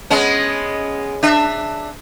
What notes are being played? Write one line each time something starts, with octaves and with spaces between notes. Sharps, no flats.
G#3 B3 C#4
D4 E5